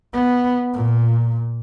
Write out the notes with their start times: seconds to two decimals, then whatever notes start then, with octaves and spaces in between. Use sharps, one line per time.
0.13 B3
0.74 A#2